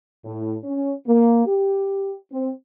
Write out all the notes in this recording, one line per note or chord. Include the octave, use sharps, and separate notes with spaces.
A2
C#4
A#3
G4
C4